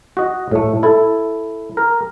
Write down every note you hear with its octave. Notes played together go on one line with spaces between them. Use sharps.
F#4 D#5
A2 A3
E4 A4
A#4